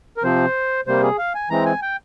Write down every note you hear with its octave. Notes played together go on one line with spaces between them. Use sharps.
A#4
C3 F3 C4 C5
C3 G3 A#3 C5
G#4
F5
G#5
E3 G#3 C4 A#5
G#5
G5